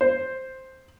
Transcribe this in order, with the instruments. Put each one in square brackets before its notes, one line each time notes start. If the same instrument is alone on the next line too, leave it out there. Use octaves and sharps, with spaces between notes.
[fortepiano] C5